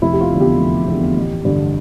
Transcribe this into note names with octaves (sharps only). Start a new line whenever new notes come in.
F1 E4
G4
F4
E2 D3
G4
F1
E2 D3
A1
G2 D3